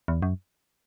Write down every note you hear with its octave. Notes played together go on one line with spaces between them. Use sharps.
E2
F#2